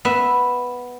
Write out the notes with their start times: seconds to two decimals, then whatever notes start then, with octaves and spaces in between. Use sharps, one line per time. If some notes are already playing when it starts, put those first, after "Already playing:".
0.05 B3 E5